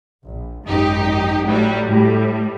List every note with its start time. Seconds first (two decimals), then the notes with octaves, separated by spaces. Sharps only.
0.24 A#1
0.64 G#1 F#2 D#4 G4
1.46 A2 F#3 G3
1.87 A2 G3